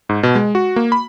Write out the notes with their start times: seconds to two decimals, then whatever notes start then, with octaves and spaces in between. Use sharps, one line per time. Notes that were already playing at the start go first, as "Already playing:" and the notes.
0.09 G#2
0.23 B2
0.35 G#3
0.55 F#4
0.76 A#3
0.92 B5